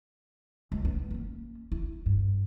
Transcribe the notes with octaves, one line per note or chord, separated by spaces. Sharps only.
C#2 F#3
B3
A#3 C#4
E4
G2